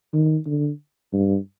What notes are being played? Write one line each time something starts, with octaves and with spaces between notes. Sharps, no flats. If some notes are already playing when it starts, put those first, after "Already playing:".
D#3
D3
G2